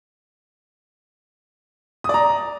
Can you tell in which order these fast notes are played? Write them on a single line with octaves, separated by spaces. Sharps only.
D#6 D5 A#5